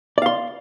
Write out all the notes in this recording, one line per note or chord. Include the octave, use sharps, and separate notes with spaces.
D5 F5 C6